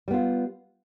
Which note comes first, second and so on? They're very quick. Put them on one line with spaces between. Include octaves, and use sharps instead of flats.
G3 B3 F4